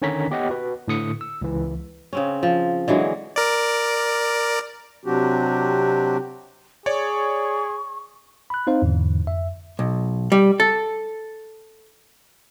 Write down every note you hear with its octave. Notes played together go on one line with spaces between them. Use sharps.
D3 D#3 C#4 C#5 A#5 B6
B3 G4 C#5 D#5 F#5 G5
F#4 B4
A2 D3 D#6 C#7
E6
C#2 E3
C#3 C4 C#4
F3
D3 E3 F#3 G#3
A#4 D5
C3 F#3 C4 D4 F#4 G4
G#4 C#5 D5 C#6
B5 F#6
C4 D#4 C5 F5
E2 G#2 D3 E3
F2 E5
B1
G3
A4